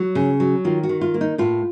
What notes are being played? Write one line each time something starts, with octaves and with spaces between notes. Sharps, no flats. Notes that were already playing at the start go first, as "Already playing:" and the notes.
Already playing: F#3
C#3
F#3
D#3 F4
F#4
D#3
F4
A#3
D#4
A2 F4